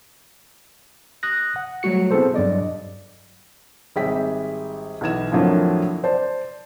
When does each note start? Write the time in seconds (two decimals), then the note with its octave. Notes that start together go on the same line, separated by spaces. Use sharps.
1.23 D#6 F#6 A#6
1.56 F#5
1.83 F#3 G3 A3 F#4 C#7
2.11 B3 C4 E4 G#4 A4 C5
2.34 G2 F#3 D5 D#5
3.96 G#1 G3 G#4 E5 G5 B6
5.01 B1 E3 G#6 E7
5.31 F2 A2 D3 F3 F#3 A#3
6.04 C5 D5 A5